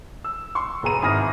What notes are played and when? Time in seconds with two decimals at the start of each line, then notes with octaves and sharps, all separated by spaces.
0.24 E6
0.55 C6 C#6
0.83 E1 B3 G#4 A#5 D#7
1.02 G#1 E4 G#5 D#6 F6 A#6